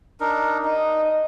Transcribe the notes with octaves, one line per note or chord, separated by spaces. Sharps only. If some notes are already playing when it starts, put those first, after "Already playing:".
D4 D#4 A#4
D#4 D#5